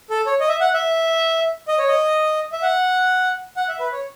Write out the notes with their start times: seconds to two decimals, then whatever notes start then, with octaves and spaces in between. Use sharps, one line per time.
0.10 A4
0.26 C#5
0.40 D#5
0.49 E5
0.61 F#5
0.73 E5
1.68 D#5
1.78 C#5
1.88 D#5
2.53 E5
2.62 F#5
3.57 F#5
3.69 E5
3.80 B4
3.92 C#5